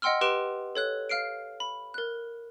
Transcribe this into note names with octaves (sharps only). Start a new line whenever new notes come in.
D#5 F#5 G5 C6 E6 F6
G4 B4 C6 D7 E7
A4 C#5 F#6
F5 F6 C7 D7
B5
A#4 F#6